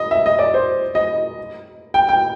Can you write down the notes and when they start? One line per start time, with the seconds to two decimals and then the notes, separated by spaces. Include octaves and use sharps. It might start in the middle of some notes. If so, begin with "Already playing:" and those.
Already playing: D#5
0.11 E5
0.26 D#5
0.39 D5
0.54 C5
0.95 D#5
1.94 G5
2.09 G5